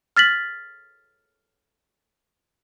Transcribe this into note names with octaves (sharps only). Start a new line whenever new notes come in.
F6 A6 B6 F#7